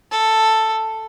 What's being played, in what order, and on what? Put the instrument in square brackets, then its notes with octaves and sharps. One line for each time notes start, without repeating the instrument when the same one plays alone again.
[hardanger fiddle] A4